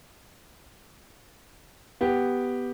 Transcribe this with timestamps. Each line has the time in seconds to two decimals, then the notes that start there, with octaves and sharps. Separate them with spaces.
2.01 B3 G4